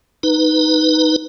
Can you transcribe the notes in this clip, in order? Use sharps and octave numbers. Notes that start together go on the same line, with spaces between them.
D#4 B4